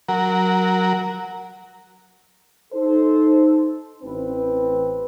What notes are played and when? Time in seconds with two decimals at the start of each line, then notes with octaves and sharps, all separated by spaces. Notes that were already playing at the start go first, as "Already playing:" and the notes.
0.08 F#3 A#4
2.73 D#4 A4 C5
4.03 A1 C4 B4